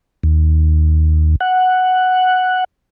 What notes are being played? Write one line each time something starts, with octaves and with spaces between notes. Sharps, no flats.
D#2
F#5